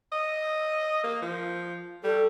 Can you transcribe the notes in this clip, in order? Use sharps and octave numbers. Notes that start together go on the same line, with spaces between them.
D#5
A#3
F3
G3 A4